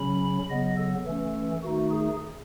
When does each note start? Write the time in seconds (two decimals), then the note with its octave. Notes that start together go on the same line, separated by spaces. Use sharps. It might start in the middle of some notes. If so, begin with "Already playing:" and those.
Already playing: C#3 F#3 C#4 B5
0.50 C#3 F#3 B3 D#5
0.78 A4
1.06 E3 A3 C#4
1.63 D#3 A3 D#4 F#4
1.91 G#4